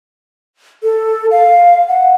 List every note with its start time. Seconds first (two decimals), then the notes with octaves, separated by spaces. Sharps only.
0.83 A4
1.31 F5
1.88 F#5